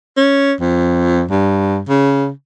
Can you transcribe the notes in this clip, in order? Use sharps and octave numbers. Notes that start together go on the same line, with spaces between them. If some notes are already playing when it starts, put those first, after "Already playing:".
C#4
F2
G2
C#3